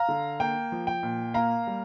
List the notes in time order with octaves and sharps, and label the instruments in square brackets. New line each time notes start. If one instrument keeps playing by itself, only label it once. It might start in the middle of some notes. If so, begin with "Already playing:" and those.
Already playing: [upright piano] F5 A#5
D3
A#3 G5
F3
G5
A#2
A#3 F5 A#5
G3